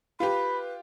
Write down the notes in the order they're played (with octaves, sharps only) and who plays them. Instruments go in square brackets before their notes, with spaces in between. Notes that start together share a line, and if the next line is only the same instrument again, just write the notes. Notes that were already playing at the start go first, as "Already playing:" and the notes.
[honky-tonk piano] F4 G4 [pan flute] B4 [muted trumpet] B5